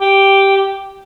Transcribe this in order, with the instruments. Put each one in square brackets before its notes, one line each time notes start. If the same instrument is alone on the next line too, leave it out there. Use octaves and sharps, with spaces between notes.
[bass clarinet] G4